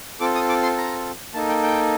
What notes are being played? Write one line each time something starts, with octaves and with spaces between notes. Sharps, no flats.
C4 F4 A4 D6
D#6
D6
C6
A#5
A#3 D#4 A4 A5
G5
G5